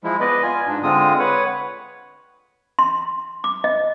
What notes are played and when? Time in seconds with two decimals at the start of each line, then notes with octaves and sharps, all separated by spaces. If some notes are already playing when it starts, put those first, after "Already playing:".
0.04 F3 G#3 E4
0.20 B3 B4 D5 D#5
0.43 F4 G#5
0.67 G#2 D4
0.83 D3 G#3 C4 F4 D#6
1.19 B4 C#5 F#5
2.79 C6
3.44 D6
3.64 D#5